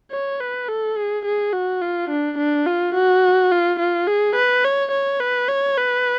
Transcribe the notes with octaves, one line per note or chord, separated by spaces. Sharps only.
C#5
B4
A4
G#4
G#4
F#4
F4
D4
D4
F4
F#4
F4
F4
G#4
B4
C#5
C#5
B4
C#5
B4